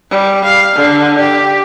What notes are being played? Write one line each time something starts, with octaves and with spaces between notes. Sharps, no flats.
G3
F5
D3
G4